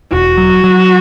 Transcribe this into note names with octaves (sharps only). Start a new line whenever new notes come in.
E1 F#4
F#3
F#3